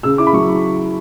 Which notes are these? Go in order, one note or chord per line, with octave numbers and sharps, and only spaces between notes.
C#3 E6
E4 D6
B5
F#3 C#6